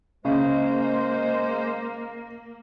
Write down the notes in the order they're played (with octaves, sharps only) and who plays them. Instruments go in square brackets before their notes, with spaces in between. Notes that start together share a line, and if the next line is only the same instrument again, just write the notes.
[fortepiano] C#3 [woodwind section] G#3 C5 [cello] A#3